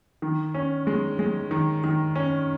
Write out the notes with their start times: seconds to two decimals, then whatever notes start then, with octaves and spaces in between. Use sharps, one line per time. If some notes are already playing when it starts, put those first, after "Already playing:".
0.22 D#3
0.54 C#4
0.87 G#3
1.19 G#3
1.51 D#3
1.84 D#3
2.15 C#4